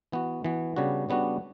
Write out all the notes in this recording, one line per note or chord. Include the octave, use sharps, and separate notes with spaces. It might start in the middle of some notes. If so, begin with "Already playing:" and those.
E3 B3 F#4
E3 B3 F#4
C#3 G3 B3 D4 F#4
C#3 G3 B3 D4 F#4